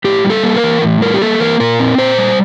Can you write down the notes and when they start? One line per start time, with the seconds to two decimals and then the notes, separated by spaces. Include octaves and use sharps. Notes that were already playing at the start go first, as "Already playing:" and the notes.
0.04 A2 G4
0.25 G3
0.30 A4
0.43 A#3
0.56 A#4
0.63 E3
0.82 A2
1.01 G3 A#4
1.14 G4
1.21 A#3 A4
1.40 E3 A#4
1.60 A#2 A#4
1.80 C4
1.98 A#2 C5
2.18 G3